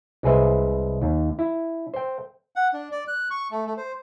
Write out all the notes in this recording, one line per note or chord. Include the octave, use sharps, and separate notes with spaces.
C2 G#3 G#4 B4 C5 E5
D#2
E4
C5 G5
F#5
D4
D5
F#6
C#6
A3
A3
C5